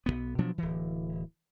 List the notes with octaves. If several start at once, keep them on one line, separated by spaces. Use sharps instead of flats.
B1 F2 B3
B2 F3 F#3 D4
D1 E3